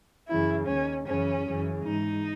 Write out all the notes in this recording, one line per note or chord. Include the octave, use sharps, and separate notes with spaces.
F#2 C#3 E3 E4
D#2 D#3 C#4
F#2 C#3 E3 C#4
F#2 C#3 E3
G#2 E3 D#4